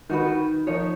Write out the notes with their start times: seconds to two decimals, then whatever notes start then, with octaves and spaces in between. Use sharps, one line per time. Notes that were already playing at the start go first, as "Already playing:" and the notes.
0.09 D#3 D#4 F#4 B4
0.67 F3 D#4 A#4 C#5